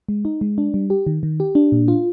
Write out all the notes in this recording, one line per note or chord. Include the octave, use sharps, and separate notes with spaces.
G#3
D#4
G#3
D4
G3
G4
D#3
D#3
G4
D4
A#2
F4